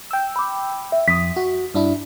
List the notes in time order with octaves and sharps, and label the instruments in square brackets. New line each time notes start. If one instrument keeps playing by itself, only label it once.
[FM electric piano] G5 E6
[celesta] B5 D6
E5
[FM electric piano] F2 D#6 [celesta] B6
[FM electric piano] F#4
G2 D4 E4